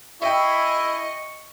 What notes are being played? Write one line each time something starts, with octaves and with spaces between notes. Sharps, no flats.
E4 G#4 D#5 E5 G5 C#6